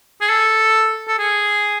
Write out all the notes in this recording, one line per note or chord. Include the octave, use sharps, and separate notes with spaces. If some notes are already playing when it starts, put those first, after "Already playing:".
G#4
A4
A4
G#4